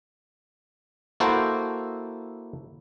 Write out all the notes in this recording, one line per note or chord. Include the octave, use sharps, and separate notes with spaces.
A#3 E4 F#4 A4 C5